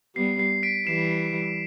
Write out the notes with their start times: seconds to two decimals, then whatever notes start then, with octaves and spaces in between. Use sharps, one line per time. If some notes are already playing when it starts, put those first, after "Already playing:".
0.16 G3 B3 C7
0.39 C7
0.63 B6 D7
0.87 E3 G3 C7 E7